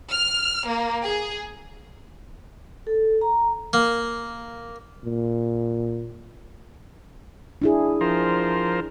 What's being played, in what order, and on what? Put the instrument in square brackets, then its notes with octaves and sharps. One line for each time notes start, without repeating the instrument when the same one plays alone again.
[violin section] F6
A#3
G#4
[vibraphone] A4
A#5
[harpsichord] A#3
[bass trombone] A#2
[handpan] D4 E4 G#4
[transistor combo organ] F3 A#4 C5